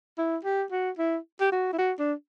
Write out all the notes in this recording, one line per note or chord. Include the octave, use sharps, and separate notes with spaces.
E4
G4
F#4
E4
G4
F#4
E4
F#4
D4